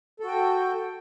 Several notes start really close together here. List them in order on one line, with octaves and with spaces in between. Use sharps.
A4 F#4 G5